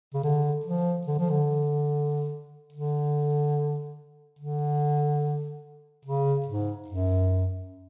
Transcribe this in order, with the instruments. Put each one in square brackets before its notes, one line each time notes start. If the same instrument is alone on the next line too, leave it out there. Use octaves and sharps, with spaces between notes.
[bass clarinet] C#3
D3
F3
D3
F3
D3
D3
D3
C#3
G#2
F#2